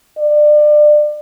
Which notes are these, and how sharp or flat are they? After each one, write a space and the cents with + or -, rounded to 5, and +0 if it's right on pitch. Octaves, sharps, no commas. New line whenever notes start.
D5 +30